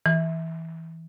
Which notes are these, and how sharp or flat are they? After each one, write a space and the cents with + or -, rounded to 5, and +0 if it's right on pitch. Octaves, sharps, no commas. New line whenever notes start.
E3 -15